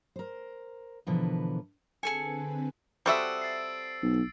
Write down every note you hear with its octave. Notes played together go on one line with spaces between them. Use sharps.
A#4 C5
B2 D3 E3 F3 A#4 B4
D3 C4 G#4 A4 B4 G#5 G#6 C#7
G3 C4 F#4 A4 E5 D#6 E6 D7
A6 C7
B1